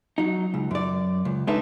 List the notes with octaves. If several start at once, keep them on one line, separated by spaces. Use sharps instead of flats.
F#3 D#4
C#2
F#2 D5
C#2
G#3 D4 D#4 A4 B4 E5